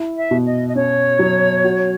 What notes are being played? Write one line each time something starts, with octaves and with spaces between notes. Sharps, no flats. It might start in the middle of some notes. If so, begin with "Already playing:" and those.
Already playing: E4
E5
B2
D#5
D#5
C#4 C#5
F#3
F#4